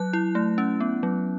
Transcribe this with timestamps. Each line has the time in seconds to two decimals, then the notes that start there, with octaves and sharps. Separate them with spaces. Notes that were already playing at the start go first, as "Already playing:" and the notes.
Already playing: F#3 F#6
0.13 E4
0.35 A3
0.58 C#4
0.80 B3
1.03 F#3